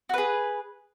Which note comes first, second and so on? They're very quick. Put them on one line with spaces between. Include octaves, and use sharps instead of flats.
F#4 B4 G#4